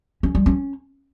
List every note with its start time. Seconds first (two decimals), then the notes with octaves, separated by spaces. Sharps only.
0.23 C#4
0.35 G3
0.46 C#4